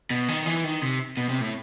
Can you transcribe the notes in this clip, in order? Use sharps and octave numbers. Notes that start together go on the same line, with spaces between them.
B2
D#3
E3
D#3
C3
B2
C3
A2